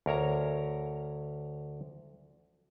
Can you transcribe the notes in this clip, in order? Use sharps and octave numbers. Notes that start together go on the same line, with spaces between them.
D2 A#4 C#5 A#5